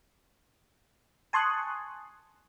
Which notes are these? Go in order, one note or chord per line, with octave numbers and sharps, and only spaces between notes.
G#5 A5 C6 C#6 D#6 F#6